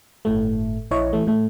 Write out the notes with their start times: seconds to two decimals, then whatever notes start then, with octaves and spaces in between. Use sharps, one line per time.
0.25 G1 A2 A3
0.91 A#1 E4 C#5 D#5
1.13 E3 A3
1.27 A2 A3